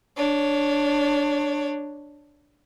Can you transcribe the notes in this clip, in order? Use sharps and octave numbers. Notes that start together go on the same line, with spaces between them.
D4 C#5